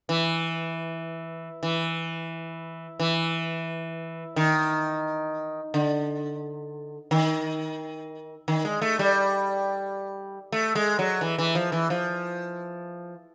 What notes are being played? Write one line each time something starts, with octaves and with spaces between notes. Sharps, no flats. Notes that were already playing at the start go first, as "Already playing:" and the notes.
E3
E3
E3
D#3
D3
D#3
D#3
G#3
A3
G3
A3
G#3
F#3
E3
E3
F3
E3
F3